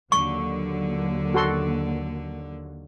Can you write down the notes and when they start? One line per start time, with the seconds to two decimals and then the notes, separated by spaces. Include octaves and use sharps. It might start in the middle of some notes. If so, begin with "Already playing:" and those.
0.12 D#2 D3 F#3 A#3 C#6
1.34 F#4 A4 C6